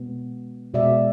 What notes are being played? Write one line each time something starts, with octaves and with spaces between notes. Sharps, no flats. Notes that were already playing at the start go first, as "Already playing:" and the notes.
Already playing: B2 G#3 B3
B2 G#3 B3 D5 E5